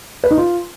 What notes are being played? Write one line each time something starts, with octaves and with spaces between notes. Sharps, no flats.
B4
D#4
F4